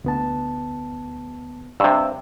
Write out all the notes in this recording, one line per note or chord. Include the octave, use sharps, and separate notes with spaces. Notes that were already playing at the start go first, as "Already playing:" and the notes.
D2 B3 A5
G2 C3 E6